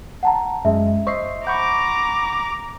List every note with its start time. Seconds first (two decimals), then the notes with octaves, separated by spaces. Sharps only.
0.23 F#5 A5 A#5
0.65 F#2 G#3 E5
1.07 C5 D#5 E5 C#6 C7
1.47 F#5 A#5 B5 C#6 D6 G6